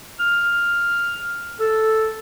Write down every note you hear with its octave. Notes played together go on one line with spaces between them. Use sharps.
F6
A4